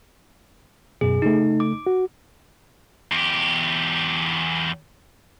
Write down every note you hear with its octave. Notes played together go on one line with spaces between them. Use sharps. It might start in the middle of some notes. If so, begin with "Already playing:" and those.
F#2 B2 G#4
C#3 A3 D#4
D6
F#4
E2 G4